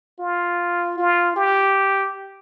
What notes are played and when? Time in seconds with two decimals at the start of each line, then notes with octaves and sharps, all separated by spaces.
0.20 F4
0.98 F4
1.36 G4